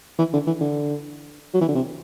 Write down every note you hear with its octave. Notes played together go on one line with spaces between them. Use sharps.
E3
D3
E3
D3
F#3
E3
D3
C3